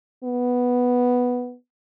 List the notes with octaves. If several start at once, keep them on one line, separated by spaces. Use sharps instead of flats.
B3